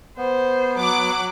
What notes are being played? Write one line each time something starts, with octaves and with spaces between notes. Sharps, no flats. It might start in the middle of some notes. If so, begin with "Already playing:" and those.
B3 C5
F#3 F#5 D6